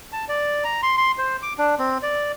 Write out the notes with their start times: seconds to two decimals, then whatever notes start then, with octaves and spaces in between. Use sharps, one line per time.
0.13 A5
0.28 D5
0.64 A#5
0.83 C6
0.97 C6
1.18 C5
1.42 D6
1.58 D4
1.79 C4
2.02 D5